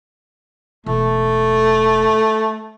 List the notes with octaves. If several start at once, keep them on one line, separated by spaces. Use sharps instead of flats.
E1 A3